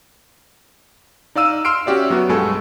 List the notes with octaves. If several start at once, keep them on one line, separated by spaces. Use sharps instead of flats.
D#4 D5 F5 E6 D#7
C6 E6 F6 C7 D7
C#4 F#4 G4 D5 E5
F#3 B3 F#4
B1 G2 G#3 F#4 A4 G#5